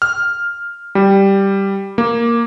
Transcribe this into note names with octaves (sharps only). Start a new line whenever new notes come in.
F6
G3
A#3